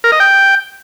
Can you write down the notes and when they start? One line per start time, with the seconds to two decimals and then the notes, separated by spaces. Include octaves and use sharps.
0.04 A#4
0.12 D#5
0.20 G5